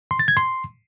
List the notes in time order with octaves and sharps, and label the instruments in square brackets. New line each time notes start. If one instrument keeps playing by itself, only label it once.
[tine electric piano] C6
A6
G#6
C6